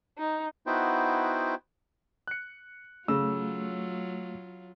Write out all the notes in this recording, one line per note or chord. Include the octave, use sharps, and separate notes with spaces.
D#4
B3 D#4 E4 F#4 C5 G5
F#6 C#7
C#3 F#3 A3 F4 E6